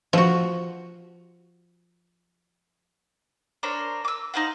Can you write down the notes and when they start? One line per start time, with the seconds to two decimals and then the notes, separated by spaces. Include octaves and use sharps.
0.13 F3 F#4
3.63 D4 A#4 C5 C#5
4.05 D6 E6
4.34 D#4 C5 F5 F#5